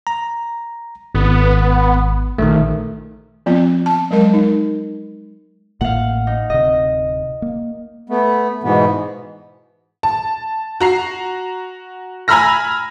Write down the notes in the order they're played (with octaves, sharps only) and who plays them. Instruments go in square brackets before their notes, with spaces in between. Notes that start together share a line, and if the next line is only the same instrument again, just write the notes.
[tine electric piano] A#5
[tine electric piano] G#1 [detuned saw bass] B3
[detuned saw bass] A#1 [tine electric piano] D#3 A3
[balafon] F3 B3 C4 F4
A5
F#3 G#3 A#4 D#5
D#4
[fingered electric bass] A1 A2 A#3 [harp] F5 F#5
[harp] D#4
[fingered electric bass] D1 C3 [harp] D#5
[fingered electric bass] A#3
[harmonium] A3 B3
G#2 B2 E3 B3
[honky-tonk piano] A5
F#4 A#5 C7
G#5 A#5 B5 E6 F6 A#6